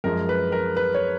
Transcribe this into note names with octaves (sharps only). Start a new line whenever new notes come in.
F#2 F3 G#3 A#4
B4
A#4
B4
C#5